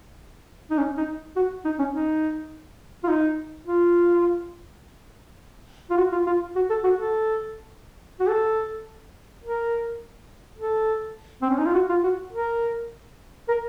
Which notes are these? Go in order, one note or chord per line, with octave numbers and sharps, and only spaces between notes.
D#4
C#4
D#4
F#4
D#4
C#4
D#4
F4
D#4
F4
F4
F#4
F4
F4
F#4
A4
F#4
A4
F#4
A4
A#4
A4
C4
C#4
D#4
F4
F#4
F4
F#4
A#4
A#4